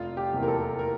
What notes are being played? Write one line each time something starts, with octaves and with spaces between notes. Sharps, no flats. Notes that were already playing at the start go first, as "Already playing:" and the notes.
Already playing: F1 F4
G4
E2 C3 E3 A#3
A#4
A4
A#4